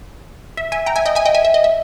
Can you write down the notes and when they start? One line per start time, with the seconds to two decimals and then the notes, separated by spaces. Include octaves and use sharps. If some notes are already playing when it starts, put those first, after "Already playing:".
0.57 E5
0.72 E5 G#5
0.86 G5 A#5
0.96 E5 G#5
1.06 D#5 G5
1.15 E5 G#5
1.26 D#5 G5
1.35 E5 G#5
1.45 E5
1.54 D#5
1.64 E5